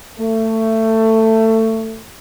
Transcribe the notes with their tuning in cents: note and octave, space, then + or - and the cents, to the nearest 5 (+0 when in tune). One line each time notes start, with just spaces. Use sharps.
A3 +20